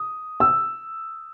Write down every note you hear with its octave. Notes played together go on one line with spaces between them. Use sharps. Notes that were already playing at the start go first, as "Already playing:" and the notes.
Already playing: D#6
E6